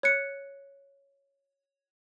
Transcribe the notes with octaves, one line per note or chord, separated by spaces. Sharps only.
C#5 F#6 C#7